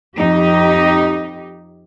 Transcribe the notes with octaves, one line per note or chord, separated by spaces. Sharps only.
F2 D#4 G4